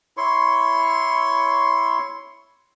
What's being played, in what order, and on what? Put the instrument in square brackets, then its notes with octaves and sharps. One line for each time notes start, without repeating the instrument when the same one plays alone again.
[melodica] E4 C#5 C6 C#6